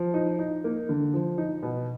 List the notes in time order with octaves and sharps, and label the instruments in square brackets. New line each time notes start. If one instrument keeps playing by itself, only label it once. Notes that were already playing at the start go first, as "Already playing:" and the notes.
Already playing: [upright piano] F3
D#4
D#4
A#3
D3
F3
D#4
B2